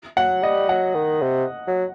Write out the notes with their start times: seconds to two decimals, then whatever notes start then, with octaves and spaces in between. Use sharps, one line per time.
0.17 F#3 F#5
0.43 G3 D#5
0.69 F#3 F#5
0.95 D#3
1.21 C3
1.68 F#3